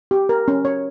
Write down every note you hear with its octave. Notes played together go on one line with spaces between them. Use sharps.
G4
A#4
C#4
C#5